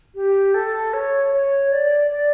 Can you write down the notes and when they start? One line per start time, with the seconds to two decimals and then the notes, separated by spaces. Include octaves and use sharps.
0.15 G4
0.54 A4
0.94 C#5
1.33 C#5
1.72 D5
2.11 D5